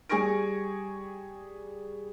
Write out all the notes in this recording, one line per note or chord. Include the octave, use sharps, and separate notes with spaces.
G3 G#4 G#5 C#6 A#6 D7